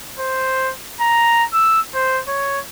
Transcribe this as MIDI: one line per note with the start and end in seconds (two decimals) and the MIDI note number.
0.19 0.72 72
1.00 1.44 82
1.54 1.81 88
1.95 2.21 72
2.28 2.60 73